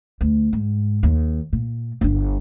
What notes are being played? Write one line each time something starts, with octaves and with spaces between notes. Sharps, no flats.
D2
G#2
D#2
A#2
G1 D4